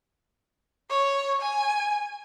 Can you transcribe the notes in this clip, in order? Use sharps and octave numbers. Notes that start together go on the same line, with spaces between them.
C#5
G#5